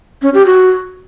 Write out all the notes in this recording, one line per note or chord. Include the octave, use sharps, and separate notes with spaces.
C#4
G4
F#4